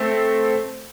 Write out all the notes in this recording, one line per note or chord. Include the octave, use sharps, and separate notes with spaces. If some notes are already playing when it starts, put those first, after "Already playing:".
Already playing: A3 C4